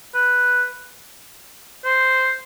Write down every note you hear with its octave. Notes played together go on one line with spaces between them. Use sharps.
B4
C5